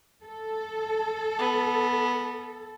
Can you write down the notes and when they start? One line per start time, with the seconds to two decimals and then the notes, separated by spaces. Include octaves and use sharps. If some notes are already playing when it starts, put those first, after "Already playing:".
0.23 A4
1.39 B3